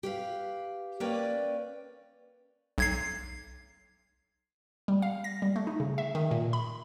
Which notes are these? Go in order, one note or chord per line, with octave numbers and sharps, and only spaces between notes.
G4 B4 F5
A#3 C#4 B4 D5 G5
B1 G#6 C7
G3
F5
A#6
G3
A3
D#4
C#3
E5
D#3
A#2
B5